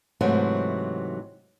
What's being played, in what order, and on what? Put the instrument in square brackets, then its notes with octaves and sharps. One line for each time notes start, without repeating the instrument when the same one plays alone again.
[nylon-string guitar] G#2 C3 E3 F#3 A3